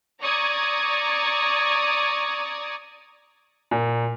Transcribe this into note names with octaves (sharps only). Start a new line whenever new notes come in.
D5 A#5 C#6 D#6 G#6
A#2